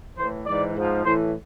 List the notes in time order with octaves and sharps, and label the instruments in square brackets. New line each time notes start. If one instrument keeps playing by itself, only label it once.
[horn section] A2 E3 C5
G#2 E3 D5
G#2 F3
A2 E3 C5